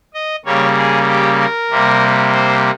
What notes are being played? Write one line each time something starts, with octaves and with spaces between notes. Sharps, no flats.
D#5
C#3 G3 A#3 C#5
G#4
G4
A#4
C3 G3 A#3
C5